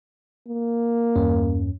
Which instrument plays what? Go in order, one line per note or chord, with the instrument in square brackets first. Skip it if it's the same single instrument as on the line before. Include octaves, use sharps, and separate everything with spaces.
[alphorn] A#3
[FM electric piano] E2 G2 C#4